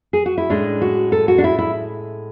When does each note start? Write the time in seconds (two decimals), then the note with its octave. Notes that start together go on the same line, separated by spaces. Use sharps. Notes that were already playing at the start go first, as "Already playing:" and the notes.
0.13 G#4
0.26 F#4
0.38 E4
0.50 A2 G#3 C#4 D4
0.81 F#4
1.12 A4
1.28 F#4
1.38 D4
1.44 E4
1.59 E4